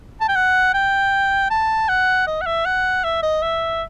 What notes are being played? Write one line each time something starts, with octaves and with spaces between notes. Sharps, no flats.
A5
G5
F#5
G5
A5
F#5
D#5
F#5
E5
F#5
E5
D#5
E5